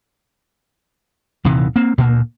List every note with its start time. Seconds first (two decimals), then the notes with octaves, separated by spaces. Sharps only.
1.45 D#1 C3 D#3 E3
1.76 A#3 C4
1.98 D2 A#2 A#3